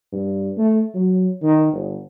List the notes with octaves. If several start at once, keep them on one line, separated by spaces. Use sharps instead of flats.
G2
A3
F#3
D#3
G1